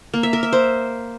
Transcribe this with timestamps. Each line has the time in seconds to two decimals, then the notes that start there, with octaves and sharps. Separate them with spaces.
0.14 A#3
0.23 E5
0.33 A#4
0.43 E5
0.53 C5